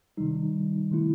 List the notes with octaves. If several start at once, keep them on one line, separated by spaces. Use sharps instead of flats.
C3 D#3 G3 D#4
D#3 A3 E4